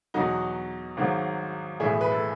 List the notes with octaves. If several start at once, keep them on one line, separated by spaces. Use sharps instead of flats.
E2 B2 F#3 D#4 F#4
G#1 G#2 D#3 F#3
B1 A2 E3 E4 G#4
B4
A4